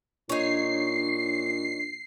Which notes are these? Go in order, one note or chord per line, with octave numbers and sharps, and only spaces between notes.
A#2 D4 D#4 C#5 C7